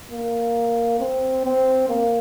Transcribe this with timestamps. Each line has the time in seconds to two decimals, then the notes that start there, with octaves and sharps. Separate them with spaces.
0.11 A#3
1.00 C4
1.45 C4
1.89 A#3